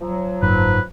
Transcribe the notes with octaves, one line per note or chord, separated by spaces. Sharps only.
F3 F#3
F#1 G#2 B4